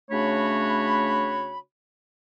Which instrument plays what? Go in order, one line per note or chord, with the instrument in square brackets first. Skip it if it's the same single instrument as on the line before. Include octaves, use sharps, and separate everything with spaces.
[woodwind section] C#3 A3 D4 F#4 C#5 B5